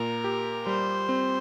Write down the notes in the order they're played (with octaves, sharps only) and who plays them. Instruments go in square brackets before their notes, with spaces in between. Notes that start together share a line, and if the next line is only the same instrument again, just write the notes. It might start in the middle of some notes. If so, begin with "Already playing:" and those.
Already playing: [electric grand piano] A#2 [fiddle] A#4
[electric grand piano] G4
[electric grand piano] G3 [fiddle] C5
[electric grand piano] C4